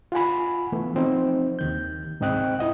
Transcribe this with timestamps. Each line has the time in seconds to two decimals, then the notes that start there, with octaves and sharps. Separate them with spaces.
0.12 F4 F#5 G#5 B5
0.72 E3 A3 B3
0.94 F3 C4 D#4
1.59 D#2 D#3 G6
2.20 C2 G#2 C4 D#5 G5 F#6
2.59 E4 D#5 F#5